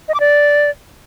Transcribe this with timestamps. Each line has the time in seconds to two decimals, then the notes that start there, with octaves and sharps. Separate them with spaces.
0.08 D#5
0.14 D6
0.20 D5